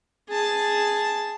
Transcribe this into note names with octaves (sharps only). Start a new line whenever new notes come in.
G#4 A5